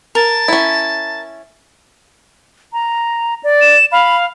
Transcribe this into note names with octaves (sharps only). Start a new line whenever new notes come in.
A#4 A5
C#4 E4
A#5
D5
E7
F5 B5